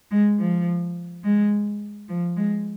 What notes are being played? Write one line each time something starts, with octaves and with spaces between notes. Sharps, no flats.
G#3
F3
G#3
F3
G#3